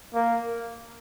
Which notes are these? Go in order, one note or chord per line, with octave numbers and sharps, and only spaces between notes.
A#3